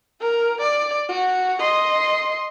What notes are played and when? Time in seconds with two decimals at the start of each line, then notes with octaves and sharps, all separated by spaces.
0.20 A#4
0.61 D5
1.09 F#4
1.60 D#5 C6